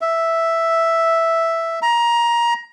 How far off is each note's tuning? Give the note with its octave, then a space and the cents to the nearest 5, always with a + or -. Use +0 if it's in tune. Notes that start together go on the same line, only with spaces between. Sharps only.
E5 +0
A#5 +20